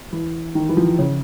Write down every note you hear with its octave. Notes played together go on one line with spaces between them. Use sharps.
E3
D#3
E3
F3
C#3